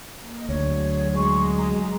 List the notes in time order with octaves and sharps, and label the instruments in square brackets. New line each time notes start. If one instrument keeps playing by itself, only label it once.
[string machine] A#3 A#4 D#5
[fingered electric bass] D2 [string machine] F#3 G#4 [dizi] C#5
[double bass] G#3 [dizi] C#6
[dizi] A#5